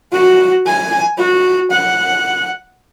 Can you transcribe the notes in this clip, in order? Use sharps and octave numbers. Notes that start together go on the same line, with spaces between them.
F#4
G#5
F#4
F#5